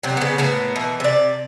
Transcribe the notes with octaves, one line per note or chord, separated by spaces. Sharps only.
C3 F#3
C#3 B3
A2 A#3 B3
B2 E3
C3 D5